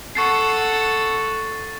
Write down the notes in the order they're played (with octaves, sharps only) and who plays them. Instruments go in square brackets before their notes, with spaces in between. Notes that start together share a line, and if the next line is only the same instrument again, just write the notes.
[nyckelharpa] A4 F#5 [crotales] C#6 A6 C7